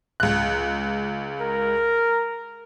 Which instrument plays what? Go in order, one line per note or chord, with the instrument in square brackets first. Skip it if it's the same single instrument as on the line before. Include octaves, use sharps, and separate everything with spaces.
[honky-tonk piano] C#2 F#6
[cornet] A#4